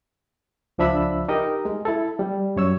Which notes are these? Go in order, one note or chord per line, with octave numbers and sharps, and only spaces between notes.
C#2 F3 D4 E5 B5 E6
D#4 G4 A#4 D#5
G#3
E4 A4
G3
F#2 C#5 E6